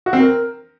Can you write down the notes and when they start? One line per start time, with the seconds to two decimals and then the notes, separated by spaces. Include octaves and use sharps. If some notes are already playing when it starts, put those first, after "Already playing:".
0.06 F#4
0.13 C4
0.20 A#4